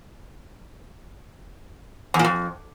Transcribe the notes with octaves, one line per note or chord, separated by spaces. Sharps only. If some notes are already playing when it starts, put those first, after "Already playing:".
E2
A#2
F2